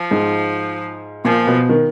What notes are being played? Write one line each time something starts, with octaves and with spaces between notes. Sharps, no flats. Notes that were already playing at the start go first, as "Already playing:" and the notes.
Already playing: F3
G#2
A#2 F3
B2
D#3